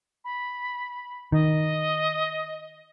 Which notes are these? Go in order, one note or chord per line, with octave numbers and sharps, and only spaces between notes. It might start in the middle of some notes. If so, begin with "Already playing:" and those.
B5
D#3 D#5